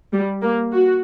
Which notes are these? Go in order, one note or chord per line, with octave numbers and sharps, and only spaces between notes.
G3
A#3
F#4